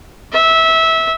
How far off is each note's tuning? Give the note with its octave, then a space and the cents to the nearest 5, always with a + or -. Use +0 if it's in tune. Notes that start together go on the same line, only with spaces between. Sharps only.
E5 -20